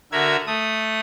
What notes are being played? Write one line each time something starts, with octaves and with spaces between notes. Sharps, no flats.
D3 F#4 A#4 E5 G#6
A3 D#6